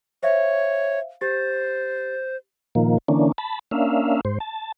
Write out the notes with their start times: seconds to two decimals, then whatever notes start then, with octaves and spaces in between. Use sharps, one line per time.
0.23 C5 C#5 E5 F5
1.21 G4 C5 A6
2.75 A#2 D#3 F3 A#3
3.08 D3 E3 A#3 C#4 D4
3.38 A5 B5
3.71 A#3 C#4 D4 E5 F5
4.25 G#2 C5
4.40 A5